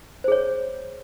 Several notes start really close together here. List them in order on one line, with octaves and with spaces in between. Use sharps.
C5 G#4 C#5